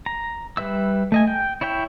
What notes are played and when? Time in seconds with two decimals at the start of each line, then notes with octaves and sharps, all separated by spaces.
0.06 A#5
0.57 G3 B4 E5 E6
1.12 A3 D#5 G#5
1.27 G5
1.61 E4 C#5 E5 G5